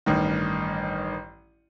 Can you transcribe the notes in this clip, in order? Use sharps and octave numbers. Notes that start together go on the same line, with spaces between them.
A1 G2 D#3